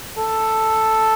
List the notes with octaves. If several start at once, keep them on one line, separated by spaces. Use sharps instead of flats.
A4